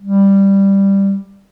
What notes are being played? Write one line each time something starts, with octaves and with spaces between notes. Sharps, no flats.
G3